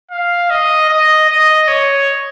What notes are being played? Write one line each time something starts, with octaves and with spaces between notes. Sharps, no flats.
F5
D#5
D#5
D#5
C#5